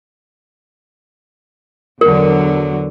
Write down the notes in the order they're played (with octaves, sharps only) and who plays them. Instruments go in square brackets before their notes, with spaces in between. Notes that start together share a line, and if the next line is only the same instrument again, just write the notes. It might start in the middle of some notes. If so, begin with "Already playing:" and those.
[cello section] E2 D3 F#3 [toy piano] A#4